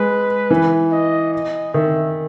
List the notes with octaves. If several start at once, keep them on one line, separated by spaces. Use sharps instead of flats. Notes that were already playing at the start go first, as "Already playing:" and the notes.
Already playing: G#3 B4
E3
D#5
D#5
D#3 E5